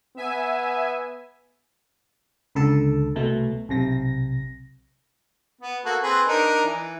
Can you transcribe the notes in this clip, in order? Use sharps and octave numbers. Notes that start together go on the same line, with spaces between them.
B3 E5 G#5
C#2 D3 A4 A5
C2 B2 A3
B1 C3 A#6
B3
A#3 F#4 A4
C4 G#4 B4
D4 D#4 A#4
E3